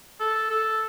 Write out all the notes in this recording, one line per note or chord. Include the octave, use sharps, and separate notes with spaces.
A4
A4